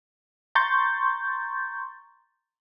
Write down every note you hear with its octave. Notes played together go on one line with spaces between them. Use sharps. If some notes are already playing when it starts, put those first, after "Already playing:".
A#5 C6 C#6 G6 A6